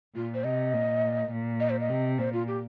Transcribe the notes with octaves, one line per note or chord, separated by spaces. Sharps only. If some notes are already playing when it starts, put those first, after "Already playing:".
A#2 F4
C5
C3 D#5
A#2
A#2
D#5
C5
D#5
C3
A#2 C5
F4
G4